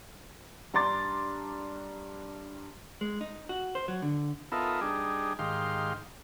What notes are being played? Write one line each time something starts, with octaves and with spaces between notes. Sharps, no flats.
G2 D4 A#5 C6 D6 A6
G#3
D#4
F#4
C5
F#3
D3
B3 D#4 F4 A4 A#4 E5
G3 D4 D#4 G#4
G#2 D#3 G4 F5 C6